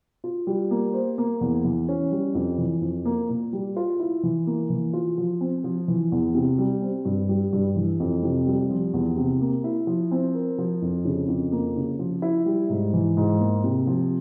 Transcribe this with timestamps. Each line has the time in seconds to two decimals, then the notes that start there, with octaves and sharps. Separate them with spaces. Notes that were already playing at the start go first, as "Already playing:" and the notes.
0.24 F4
0.47 G3
0.71 A#3
0.94 C5
1.18 A#3
1.41 E2
1.65 E3
1.89 C#4
2.11 G3
2.35 F2
2.58 E3
2.81 F2
3.05 A#3
3.29 A#2
3.53 G3
3.77 F4
4.00 E4
4.23 E3
4.47 A#3
4.70 E3
4.93 F4
5.18 F3
5.41 C4
5.64 F3
5.88 E3
6.12 E2
6.35 C3
6.58 G3
6.82 C4
7.05 G2
7.29 G3
7.53 G2
7.76 E3
8.00 F2
8.23 C3
8.47 G3
8.70 F3
8.94 E2
9.17 C3
9.41 A#3
9.64 E4
9.87 F3
10.11 C4
10.35 A#4
10.58 F3
10.82 F2
11.05 C#3
11.28 F2
11.52 A#3
11.76 C#3
11.99 F3
12.22 E4
12.46 G3
12.69 G#2
12.93 E3
13.17 G#2
13.40 A#3
13.64 C3
13.87 F3